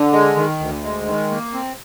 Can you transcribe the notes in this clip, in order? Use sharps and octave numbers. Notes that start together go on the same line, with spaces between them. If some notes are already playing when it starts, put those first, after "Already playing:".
Already playing: D3
G#3
D#3
D2
G#3
D#3
A#3
C4